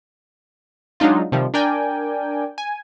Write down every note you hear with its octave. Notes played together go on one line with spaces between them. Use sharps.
F#3 G#3 D4 D#4 F4
C3 D#3 F3 G3
D4 A#4 D5 G5 G#5
G#5